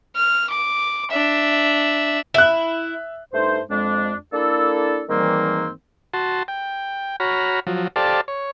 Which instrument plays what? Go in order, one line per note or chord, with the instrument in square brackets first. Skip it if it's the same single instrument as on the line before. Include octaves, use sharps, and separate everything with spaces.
[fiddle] F6
D6
D4 E5
[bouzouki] E4 [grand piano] E5 F#6
[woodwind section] G2 A3 D#4 C5
F2 G#3 D4
A#3 D4 E4 A4
G#2 D#3 E3 G3 A#3 C4
[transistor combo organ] F#4 A5 C6
G5
F#4 C#5 A#5 B5 F6
F3 F#3
G4 A4 C5 D5 F5 A5
C#5